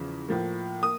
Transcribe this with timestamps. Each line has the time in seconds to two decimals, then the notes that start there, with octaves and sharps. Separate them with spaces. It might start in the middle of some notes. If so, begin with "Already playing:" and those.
Already playing: E2 C#3 F3
0.28 A2 F3 A#3
0.82 A#3 D#6